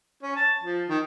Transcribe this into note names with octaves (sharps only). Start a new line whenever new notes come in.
C#4
A5
F3
D#3